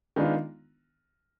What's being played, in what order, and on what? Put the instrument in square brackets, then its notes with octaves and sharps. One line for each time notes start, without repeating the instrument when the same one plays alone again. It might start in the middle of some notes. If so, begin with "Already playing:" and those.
[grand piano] D#3 G#3 B3 D4 F4